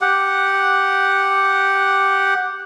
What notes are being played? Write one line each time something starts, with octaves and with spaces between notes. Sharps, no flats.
G4 F#5